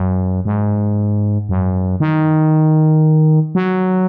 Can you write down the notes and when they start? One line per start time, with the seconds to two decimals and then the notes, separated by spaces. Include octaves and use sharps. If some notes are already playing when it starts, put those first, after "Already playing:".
Already playing: F#2
0.45 G#2
1.49 F#2
2.00 D#3
3.55 F#3